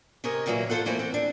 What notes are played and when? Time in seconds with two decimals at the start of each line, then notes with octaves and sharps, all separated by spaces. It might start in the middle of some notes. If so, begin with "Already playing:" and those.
0.24 C3 G#4 A#4 C#5 D#5
0.46 A#2 D3 E3 F#3 A#3
0.70 F4 A4 C5 F#5
0.86 E3 A3 A#3 C4 E4
0.99 C4
1.14 D4